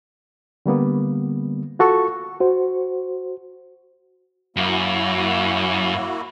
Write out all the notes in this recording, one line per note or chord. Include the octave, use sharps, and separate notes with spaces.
D3 G3 A#3 B3
F4 F#4 A4 C#6
F#4 C5
F#2 A#3 E4 F#4